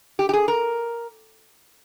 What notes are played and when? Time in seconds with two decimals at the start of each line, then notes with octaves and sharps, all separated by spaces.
0.19 G4
0.29 G4
0.33 G#4
0.48 A#4